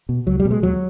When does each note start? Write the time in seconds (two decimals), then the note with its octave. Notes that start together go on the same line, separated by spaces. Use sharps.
0.09 B2
0.27 C#2 F#3
0.40 G3
0.45 B2
0.51 G#3
0.62 D#2 F#3